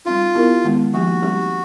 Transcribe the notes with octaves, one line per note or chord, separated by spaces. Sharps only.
G3 C4 D#4 F4
B3 E4 G4 A#4
D#3 G#3 B3
F3 A#3 D#4 F#4 G4
G3 C4 D#4 G4